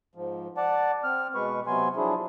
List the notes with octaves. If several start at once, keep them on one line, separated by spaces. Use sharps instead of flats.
G#2 F3
D5 F#5 A5
C4 F6
B2 G#3 B4 C#6
C3 F#3 B3 G#5 C6
F3 F#3 D4 E4 G#4